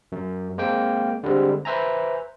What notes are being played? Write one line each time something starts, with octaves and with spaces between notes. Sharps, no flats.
F#2
G#3 A#3 C4 G5
D3 G3 G#3 C4
B4 C5 E5 G#5 A#5